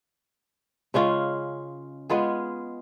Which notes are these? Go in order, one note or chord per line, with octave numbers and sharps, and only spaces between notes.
C#3 G#3 C#4 F4
G#3 B3 F4 G#4